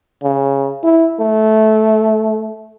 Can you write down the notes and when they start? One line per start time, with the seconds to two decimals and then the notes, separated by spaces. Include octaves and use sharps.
0.23 C#3
0.83 E4
1.20 A3